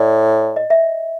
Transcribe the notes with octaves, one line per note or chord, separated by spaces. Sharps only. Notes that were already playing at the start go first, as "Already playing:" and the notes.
Already playing: A2 D5
D#5
E5